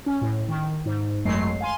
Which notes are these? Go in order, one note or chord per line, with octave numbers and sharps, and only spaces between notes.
C#4
A2
D#3
G#2
G#1 F#2 F#3 G#3 A3 C7
F5 G#5 C6